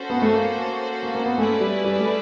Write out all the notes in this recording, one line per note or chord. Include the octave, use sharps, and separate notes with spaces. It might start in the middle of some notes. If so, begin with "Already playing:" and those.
Already playing: C#4 F#4 A4 C5
B3
A3
A#3
A#3
A#3
B3
A3 C#4 E4 G#4 B4 D5
G3
G3
A3